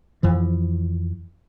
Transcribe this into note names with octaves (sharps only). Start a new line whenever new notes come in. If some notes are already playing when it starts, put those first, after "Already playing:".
F2 E3 F3